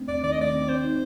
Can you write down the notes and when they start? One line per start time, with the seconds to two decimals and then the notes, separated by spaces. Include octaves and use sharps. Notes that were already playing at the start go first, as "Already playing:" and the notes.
Already playing: A3 C4 D4
0.08 D#2 D5
0.24 D#3 D5
0.32 D#5
0.39 A3 D5
0.54 C4
0.69 C4 C5
0.84 D#4